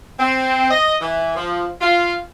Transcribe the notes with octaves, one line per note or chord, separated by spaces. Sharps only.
C4
D#5
E3
F3
F4